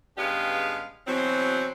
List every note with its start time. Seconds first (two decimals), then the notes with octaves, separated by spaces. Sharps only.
0.17 G2 C#3 G#3 B3 G4 F5
1.06 B2 E3 F#3 C4